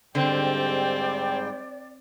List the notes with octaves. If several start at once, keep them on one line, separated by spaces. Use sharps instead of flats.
G#2 D3 G3 C4 D5 G5